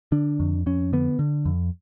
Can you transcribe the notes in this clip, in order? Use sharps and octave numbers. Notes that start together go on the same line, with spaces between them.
D3 D4
F2
F2 C#4
D3 B3
D3
F2